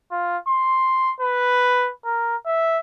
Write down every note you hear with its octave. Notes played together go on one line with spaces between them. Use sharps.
F4
C6
B4
A#4
E5